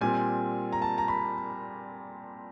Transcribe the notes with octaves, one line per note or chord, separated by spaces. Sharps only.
A#2 G3 C4 G#5
A#5
A5
A#5
B5